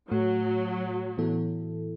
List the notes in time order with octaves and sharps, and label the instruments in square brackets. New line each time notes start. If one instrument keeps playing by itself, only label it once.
[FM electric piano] A2 A3 F#4 [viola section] F#3
[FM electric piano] A2 E3 B3 E4 A4